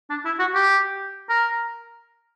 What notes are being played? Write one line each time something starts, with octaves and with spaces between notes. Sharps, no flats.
D4
E4
F#4
G4
A#4